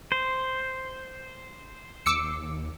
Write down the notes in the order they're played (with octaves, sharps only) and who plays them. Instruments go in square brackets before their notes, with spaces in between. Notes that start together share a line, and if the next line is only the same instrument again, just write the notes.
[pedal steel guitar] C5
[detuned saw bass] D#2 [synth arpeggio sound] D6 E6 C#7